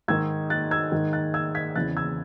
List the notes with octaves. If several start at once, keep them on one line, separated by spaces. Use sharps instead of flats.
G#2 D#3 E6 G#6
F#6 A6
E6 G#6
G#2 D#3
F#6 A6
E6 G#6
G#6 B6
E2 C#3 E3 F#6 A6
E6 G#6